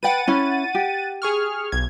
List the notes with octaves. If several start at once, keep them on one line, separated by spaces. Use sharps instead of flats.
B4 F#5 G5 A6 D#7
C#4 E4
G4
G#4 C#6 F6
B1 G#6